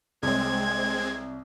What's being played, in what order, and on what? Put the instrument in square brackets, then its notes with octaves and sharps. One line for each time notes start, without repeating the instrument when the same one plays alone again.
[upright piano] C2 C#5 [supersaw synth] G#3 C4 [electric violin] G#6